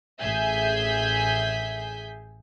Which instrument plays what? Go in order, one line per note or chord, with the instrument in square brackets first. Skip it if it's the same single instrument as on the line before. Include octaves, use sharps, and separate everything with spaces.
[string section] A1 G#4 E5 G#5 G6 B6